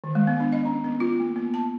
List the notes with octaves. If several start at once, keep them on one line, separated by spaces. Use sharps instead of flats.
D#3
G#3
B3
D4
D#5
C#4
B3
F4
A#3
B3
A5